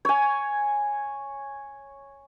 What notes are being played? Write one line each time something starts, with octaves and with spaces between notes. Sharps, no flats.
C#5 G#5